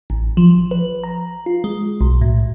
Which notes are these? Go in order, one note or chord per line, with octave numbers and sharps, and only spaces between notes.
A1
F3
B4
A#5
F4
G#3
B1
A2